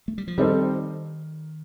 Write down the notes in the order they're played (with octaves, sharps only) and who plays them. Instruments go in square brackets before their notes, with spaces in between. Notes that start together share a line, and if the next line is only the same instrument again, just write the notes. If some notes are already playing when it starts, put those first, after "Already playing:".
[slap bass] A3
G3
F3
[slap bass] D#3 [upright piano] G3 C4 D#4 A4 C5